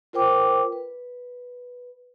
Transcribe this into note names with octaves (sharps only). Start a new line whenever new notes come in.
F4 A#4 C5 G5 D6
B4